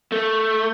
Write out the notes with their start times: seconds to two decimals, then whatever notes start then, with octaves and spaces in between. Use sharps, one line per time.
0.12 A3